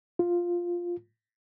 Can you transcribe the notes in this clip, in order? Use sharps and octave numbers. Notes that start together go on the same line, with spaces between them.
F4